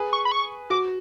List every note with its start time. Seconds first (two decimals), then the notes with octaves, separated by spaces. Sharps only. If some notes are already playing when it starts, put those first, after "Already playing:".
Already playing: G#4 B4
0.13 C#6
0.25 B5
0.32 C#6
0.70 F#4 D6